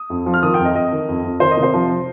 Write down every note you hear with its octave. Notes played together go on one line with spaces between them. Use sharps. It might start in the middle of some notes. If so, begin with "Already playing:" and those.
Already playing: D#6
F2
F3
F6
D#3 D#6
G5
F2
D#5
F2 D#5
D#3
F2
F2
D#3 C5
D#5
C3
C5
F3